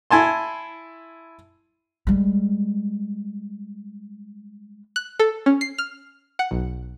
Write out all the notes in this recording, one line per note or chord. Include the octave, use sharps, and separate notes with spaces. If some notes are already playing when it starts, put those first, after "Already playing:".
E4 G#5 A5 C6
G3 G#3
F#6
A4
C#4
C7
F6
F#5
B1